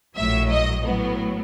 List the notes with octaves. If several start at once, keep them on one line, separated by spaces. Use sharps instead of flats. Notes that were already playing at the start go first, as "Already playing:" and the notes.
A#1 A2 F#3 E5
D#5
A2 F#3 B3